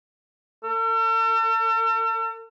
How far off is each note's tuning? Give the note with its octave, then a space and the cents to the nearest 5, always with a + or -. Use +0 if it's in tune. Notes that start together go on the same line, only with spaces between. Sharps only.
A4 +45